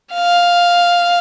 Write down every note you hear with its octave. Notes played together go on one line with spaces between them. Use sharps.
F5